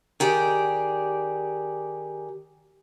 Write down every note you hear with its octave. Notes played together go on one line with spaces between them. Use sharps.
D#3 G4 G#4 D5